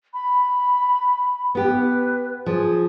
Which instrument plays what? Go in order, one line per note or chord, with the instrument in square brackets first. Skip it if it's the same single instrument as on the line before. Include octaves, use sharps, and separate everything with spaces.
[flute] B5
[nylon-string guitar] B3 G4 [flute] B4
[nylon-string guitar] F3 [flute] G#4